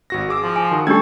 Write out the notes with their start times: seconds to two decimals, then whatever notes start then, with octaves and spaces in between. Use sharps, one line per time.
0.10 G#1 F#4 A#6
0.29 G#4 D6 E6
0.43 F3
0.56 G#5
0.71 D#3 F#4 D#6
0.87 G3 A3 C#4 D4 G4 A4 G#6